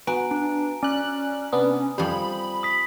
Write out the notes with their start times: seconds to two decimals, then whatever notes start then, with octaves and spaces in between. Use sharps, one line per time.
0.07 B3 F#4 G#5 A#5 D7
0.31 D4
0.83 C#4 D5 G#5 F#6
1.53 C3 B3 D4 D#6
1.98 F2 G3 C5 B5
2.63 D#6 B6